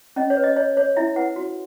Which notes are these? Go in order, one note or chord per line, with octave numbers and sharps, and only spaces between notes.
C#4 D#5
C#5
B4
D#5
C#5 D#5
C#5
E4 E5
B4 F#5
F#4